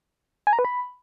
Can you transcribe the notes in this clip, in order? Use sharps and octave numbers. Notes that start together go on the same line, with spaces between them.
G#5
A#5
B4
B5